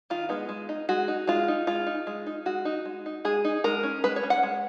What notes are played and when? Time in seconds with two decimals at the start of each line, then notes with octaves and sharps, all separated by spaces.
0.10 D#3 F4
0.29 G#3 B3 D#4
0.49 G#3
0.69 D#4
0.89 G#3 F#4
1.08 D#4
1.27 G#3 F4
1.48 D#4
1.67 G#3 F4
1.86 D#4
2.07 G#3
2.27 D#4
2.46 G#3 F#4
2.65 D#4
2.85 G#3
3.06 D#4
3.25 G#3 G#4
3.45 D#4
3.64 G#3 A#4
3.83 C#4
4.04 G#3 B4
4.16 C#5
4.23 C#4
4.30 F#5
4.43 G#3